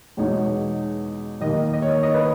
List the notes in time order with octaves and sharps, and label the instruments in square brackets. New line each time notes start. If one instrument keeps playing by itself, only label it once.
[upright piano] E2 B2 G#3 D#4 C#5
D#2 D#3 A#3 D#5
D#5
C#5
D#5
B4